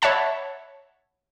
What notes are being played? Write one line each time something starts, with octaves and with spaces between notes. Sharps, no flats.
C#5 E5 F#5 A5 B5